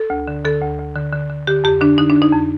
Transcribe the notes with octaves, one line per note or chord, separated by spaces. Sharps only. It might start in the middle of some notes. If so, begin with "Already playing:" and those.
Already playing: A4
D2
D3
D3 A4
D2
D2
D3
D3
D3
D3 G4
F2 G4
D3 D4
D3 D#4
D4
D3
D#4
F2